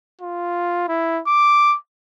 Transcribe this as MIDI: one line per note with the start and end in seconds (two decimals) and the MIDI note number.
0.21 0.86 65
0.88 1.21 64
1.27 1.76 86